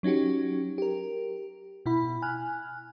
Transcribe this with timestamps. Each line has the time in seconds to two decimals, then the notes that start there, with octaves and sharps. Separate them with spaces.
0.03 F#3 C#4 D#4 F#4 G4
0.78 G4 A#4
1.86 B2 E4 B5
2.22 G#5 F6 F#6